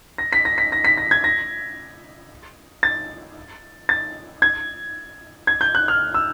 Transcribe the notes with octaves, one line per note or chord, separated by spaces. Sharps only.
A#6
B6
A#6
B6
A#6
B6
A#6
G#6
A#6
A6
A6
G#6
G#6
G6
F#6
F6
E6